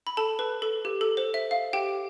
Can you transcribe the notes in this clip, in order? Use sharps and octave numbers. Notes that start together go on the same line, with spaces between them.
B5
A4 A5
B4
A4
G4
A4
C5
E5
F5
G4 G5